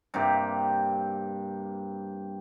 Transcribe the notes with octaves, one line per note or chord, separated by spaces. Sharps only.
G2 C3 A#3 G4